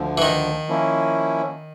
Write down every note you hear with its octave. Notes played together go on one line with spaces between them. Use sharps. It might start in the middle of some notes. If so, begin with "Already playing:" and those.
Already playing: D2 D3 F3
E3
D#3
F3 A#3 C#4 E4